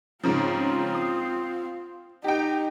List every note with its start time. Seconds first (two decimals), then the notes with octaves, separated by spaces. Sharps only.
0.24 G#2 C#3 F3 C4 F4
0.95 D#6
2.24 D#4 G4 G5